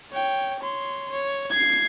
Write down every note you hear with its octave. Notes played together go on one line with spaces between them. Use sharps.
C#5 G5
C#5 C6
C#5
G#6 C7